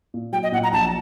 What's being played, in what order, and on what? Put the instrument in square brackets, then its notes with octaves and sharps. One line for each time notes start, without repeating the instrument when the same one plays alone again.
[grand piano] A#2
[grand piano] F#3 [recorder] G5
[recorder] D#5
[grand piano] A#2 [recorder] F#5
[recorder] A#5
[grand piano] A#1 [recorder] A5